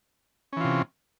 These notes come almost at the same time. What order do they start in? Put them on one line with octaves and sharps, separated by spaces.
C#4 E3 F4 C3